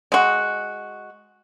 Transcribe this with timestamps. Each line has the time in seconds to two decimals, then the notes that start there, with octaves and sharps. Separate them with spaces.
0.12 G#3 F#4